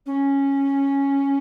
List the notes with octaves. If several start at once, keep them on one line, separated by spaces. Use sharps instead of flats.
C#4